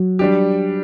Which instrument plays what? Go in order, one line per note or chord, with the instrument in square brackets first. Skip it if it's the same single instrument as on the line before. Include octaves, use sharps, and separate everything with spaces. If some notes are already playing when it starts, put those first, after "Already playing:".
Already playing: [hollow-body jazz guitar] F#3
[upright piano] G3 D4 G4